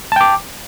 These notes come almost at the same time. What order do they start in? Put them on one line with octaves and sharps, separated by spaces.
A5 G5 D6